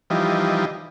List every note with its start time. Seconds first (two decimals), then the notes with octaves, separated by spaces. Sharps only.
0.10 E3 F3 G3 D#4